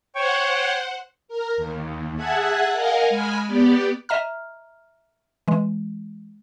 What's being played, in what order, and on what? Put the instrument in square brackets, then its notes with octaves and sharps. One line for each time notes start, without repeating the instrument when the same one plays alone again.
[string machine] C5 F#5 [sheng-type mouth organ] C#5 G5 C#6
[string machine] A#4
D#2
G#4 E5 F#5 A5 F#6 G#6
A#4 D#5 F5 F#5 G#5
G#3 G#5 B5 F6
B3 G4 D5
[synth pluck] D#5 E5 A#5 F6
E3 G#3